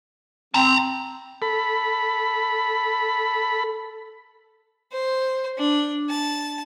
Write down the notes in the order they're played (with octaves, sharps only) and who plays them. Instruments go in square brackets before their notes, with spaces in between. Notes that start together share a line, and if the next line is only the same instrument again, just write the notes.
[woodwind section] C4 [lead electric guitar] A5 A#5
[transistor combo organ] A4 B5
[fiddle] C5
D4
A5